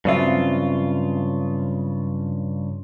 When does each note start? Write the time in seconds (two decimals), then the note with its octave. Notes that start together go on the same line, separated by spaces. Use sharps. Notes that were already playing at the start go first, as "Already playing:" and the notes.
0.05 G2 C#3 F#3 C4 F4 E5